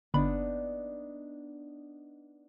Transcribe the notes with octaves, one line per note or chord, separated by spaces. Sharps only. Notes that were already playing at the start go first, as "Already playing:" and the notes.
G1 B3 D4 D#4 B5